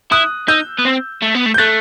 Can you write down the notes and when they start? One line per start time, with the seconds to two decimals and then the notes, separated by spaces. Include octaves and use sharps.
0.11 E4 D#6 F#6
0.48 D#4 E6 G6
0.79 B3
0.85 C4
1.22 A3
1.34 B3
1.46 A3
1.54 G6
1.58 A3 F#6 A6